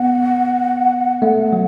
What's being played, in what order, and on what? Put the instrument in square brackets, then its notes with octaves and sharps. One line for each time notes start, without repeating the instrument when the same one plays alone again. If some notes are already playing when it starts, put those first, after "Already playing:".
Already playing: [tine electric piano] B3 [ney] F#5
[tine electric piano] A3
F#3